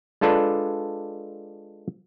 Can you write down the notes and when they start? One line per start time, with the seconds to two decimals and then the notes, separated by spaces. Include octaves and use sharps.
0.21 G#3 D4 F4 A4 B4 D5